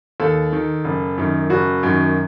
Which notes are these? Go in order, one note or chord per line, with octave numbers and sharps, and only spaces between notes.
D#2 A4
D#3
F#1
F#2 D#3
F#1 F#4
F#2 D#3